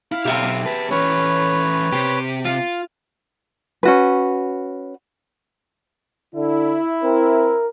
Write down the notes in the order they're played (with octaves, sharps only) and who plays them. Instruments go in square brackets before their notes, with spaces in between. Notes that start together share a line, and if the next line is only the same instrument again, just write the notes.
[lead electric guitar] E4 [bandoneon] F5
[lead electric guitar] B1 [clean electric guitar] G4 E5 G5
[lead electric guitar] G#4 B4 [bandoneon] A5
[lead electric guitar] E3 C#4 [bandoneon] B4 C#5
[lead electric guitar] C3 [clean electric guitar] G4
[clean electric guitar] F4
[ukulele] C#4 F#4 B4
[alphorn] D3 [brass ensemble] E4
[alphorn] C4 [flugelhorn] A#4